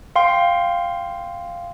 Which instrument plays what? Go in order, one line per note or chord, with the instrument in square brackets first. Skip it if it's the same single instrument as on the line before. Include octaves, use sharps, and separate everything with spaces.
[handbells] F5 G5 C6